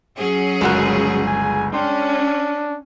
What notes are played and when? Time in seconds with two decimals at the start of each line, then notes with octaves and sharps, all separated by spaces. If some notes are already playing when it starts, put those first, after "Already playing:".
0.17 F#3 C#4 G#4
0.61 G1 C#2 G#3 F#4 A#4 F#6
1.26 G#5
1.73 C#4 D4 G5 C6